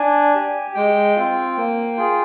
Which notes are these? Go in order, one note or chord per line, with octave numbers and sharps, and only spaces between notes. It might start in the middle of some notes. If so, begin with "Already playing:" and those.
Already playing: D4 G#5
G4
G#3 G5
C4 F4
A#3
F4 G#4